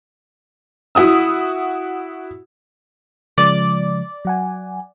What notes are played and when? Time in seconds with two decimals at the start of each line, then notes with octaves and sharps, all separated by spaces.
0.95 E4 F#4 D#6 E6
3.38 C#3 F3 G#3 D5
4.25 F#3 F#5 G#5